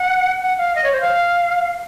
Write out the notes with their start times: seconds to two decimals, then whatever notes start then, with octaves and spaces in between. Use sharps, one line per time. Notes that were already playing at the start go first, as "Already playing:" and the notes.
Already playing: F#5
0.41 F#5
0.58 F5
0.75 D#5
0.84 C#5
0.92 C5
1.00 F5